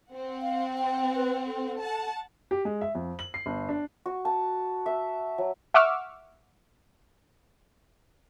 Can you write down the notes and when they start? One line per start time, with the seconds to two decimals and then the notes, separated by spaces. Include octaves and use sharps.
0.10 C4 F#5
0.42 F5
0.78 G5
1.15 B4
1.46 A4
1.80 F#5 A5
2.51 G4
2.65 G#3
2.81 E5
2.95 F2
3.19 F#7
3.34 C7
3.46 G1
3.69 D4
4.06 F#4
4.25 A5
4.86 E5
5.38 F#3
5.74 E5 F#5 C#6 D6 E6 F6